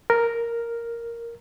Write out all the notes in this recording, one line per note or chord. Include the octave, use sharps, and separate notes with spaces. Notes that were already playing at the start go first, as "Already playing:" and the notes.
A#4